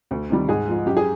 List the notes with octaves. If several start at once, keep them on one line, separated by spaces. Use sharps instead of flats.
D2
C3 D#3 G3
G#2 G#4
F3 G#3
F#2 G4
G#4